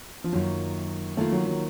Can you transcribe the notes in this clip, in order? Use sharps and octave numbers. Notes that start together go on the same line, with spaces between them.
F3
F#2 D#3 F#3 A#3 F4
D#3 A3 A#3 F4
F#3
F#3